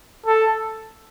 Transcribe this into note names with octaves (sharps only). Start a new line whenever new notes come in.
A4